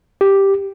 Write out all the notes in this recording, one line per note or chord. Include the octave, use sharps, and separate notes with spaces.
G4